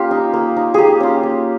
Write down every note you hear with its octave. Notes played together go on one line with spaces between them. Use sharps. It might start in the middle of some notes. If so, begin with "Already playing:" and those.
Already playing: A#3 C#4 F4 G4
D#4
A#3
D#4
A#3 G4 G#4
C#4 F4
A#3